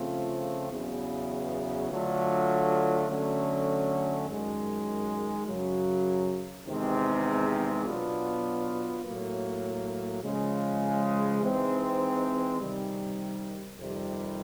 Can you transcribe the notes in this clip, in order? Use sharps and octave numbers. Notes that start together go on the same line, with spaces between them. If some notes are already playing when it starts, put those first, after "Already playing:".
Already playing: C#3 F3 A3 C4 F4
E2 C#3 F#3 B3 E4
D3 F#3 A3 D4 F4
D3 F#3 A3 C#4
F#2 D#3 G#3
F#2 C#3 F#3
E2 C3 D#3 G#3 C4
B2 F#3 B3 D4 F4
A2 F#3 A#3
C#3 F3 G#3
E3 G#3 C4 D#4
C3 D#3 G3
F2 C3 D#3 G3